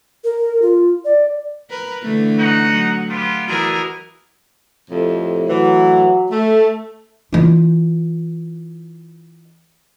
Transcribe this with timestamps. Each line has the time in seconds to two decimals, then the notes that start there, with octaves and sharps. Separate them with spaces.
0.24 A#4
0.62 F4
1.05 D5
1.70 A#4 B4
2.02 D3 E3 A3
2.39 D#4 F#4 F#5
2.70 F#3
3.09 B3 F4 G4
3.47 E3 D4 E4 F#4 G#4 A#4
4.91 F2 A2 C3
5.47 A2 E3 F#3
6.31 A3
7.33 E3 F4